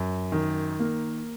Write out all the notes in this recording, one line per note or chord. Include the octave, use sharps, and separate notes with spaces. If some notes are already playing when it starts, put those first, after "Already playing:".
Already playing: F#2
D#3
A#3